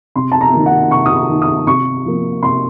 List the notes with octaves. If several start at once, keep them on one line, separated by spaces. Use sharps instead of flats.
C3 C6
A5
A#5
D#3 A#3
F#5
C3 C#6
D#6
C#6
D#3 A#3
D#6
C3 C#6
F3 A#3
C3 C6